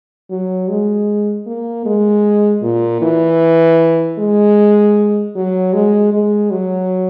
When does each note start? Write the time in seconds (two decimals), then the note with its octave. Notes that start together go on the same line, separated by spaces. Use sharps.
0.31 F#3
0.69 G#3
1.47 A#3
1.86 G#3
2.62 A#2
3.02 E3
4.18 G#3
5.36 F#3
5.74 G#3
6.13 G#3
6.51 F#3